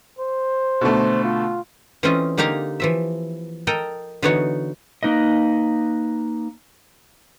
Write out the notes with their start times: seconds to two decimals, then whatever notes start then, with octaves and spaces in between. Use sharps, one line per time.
0.19 C5
0.81 B2 D3 A3
1.24 F4
2.03 E3 A3 C4 C#4 F4 D#5
2.38 D3 A#3 D#4 G4 F5 A#5
2.80 E3 F3 E5
3.67 A4 A#4 D#5 G5
4.22 D3 E3 B3 D#4 F#4 C#5
5.03 A#3 D#4 B4 D#5